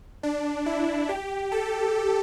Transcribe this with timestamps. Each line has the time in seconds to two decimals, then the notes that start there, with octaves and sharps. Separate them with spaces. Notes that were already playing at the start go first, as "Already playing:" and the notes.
0.23 D4
0.66 E4
1.09 G4
1.52 A4